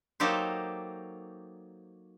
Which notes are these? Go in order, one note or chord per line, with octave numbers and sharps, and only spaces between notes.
F#3 A#3 D#4 G4 A4 C5